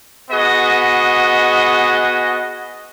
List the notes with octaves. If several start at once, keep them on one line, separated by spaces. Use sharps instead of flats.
B3 F#4 G#4 D#5